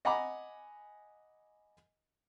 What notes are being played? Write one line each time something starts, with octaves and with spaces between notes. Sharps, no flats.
D#5 F#5 G#5 A#5 B5 D6